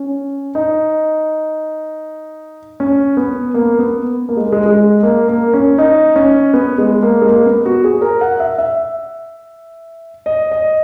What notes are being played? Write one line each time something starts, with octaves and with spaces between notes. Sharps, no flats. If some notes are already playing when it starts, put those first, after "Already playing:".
Already playing: C#4
D#4
C#4
B3
A#3
B3
A#3
G#3
G#3
G#3
A#3
A#3
C#4
D#4
C#4
B3
G#3
A#3
G#3
A#3
B3
F#4
G#4
A#4
F#5
E5
E5
D#5
D#5